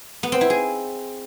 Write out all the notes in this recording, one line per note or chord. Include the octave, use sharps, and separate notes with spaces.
B3
C4
E4
G#4